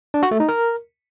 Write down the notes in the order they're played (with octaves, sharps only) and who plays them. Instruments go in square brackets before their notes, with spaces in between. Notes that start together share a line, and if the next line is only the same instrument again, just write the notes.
[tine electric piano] D4
F#4
A3
D#4
A#4